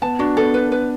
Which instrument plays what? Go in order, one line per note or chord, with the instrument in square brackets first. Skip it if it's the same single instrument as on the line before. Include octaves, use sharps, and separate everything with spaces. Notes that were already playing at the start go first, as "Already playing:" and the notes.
[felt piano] B3 [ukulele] A5
[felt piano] D4 [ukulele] F#4
[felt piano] B3 [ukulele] A4
[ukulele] B4
B4